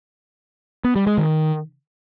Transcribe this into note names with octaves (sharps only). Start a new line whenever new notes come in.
B3
G3
G#3
D#3